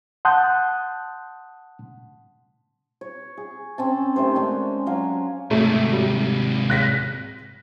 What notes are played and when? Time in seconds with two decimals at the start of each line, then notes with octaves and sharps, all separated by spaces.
0.25 F#5 A5 C6 D#6 F#6 G6
3.01 C#5
3.37 G#4
3.78 C4 C#4 A5
4.16 D#3 A3 G4 C5
4.35 G#3 C#4 D4
4.86 F#3 F5 G#5
5.51 G#2 C3 A3
5.93 G3
6.70 F#6 A#6 B6